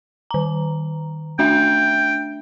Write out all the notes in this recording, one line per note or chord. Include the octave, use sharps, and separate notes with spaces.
D#3 A#5
A3 D4 E5 G5